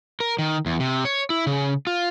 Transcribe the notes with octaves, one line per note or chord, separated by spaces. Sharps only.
A#4
D#3
E2
C3
C#5
E4
C#3
F4